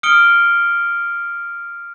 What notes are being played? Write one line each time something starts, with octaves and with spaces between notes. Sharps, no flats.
D#6 F6 C#7 D7 G7